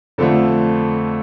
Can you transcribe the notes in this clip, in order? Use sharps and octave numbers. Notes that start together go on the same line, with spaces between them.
F2 D3 F3 A3 A4